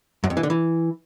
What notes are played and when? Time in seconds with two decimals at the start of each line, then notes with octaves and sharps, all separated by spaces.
0.24 F#2
0.30 F2
0.37 E3
0.43 D3
0.50 E3